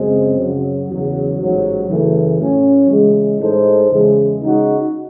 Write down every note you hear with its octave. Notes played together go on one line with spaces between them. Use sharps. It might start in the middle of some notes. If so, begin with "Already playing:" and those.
Already playing: F#2 C#3 G#3 C4
F#2 C#3 F#3
E2 C#3 F#3
A1 G#2 F#3
F#2 C#3 E3 A3
A2 F#3 C#4
C#3 E3 G#3
A2 G#3 D#4 A4 C5
E2 C#3 E3 G#3
C#3 G#3 D#4 F#4